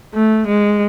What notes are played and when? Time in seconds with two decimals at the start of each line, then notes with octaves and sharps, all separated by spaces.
0.14 A3
0.47 G#3